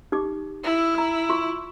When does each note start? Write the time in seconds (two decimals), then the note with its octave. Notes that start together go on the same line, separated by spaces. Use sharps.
0.12 D#4 G4 D6
0.64 E4
0.95 A#5 E6
1.29 F4 C6 C#6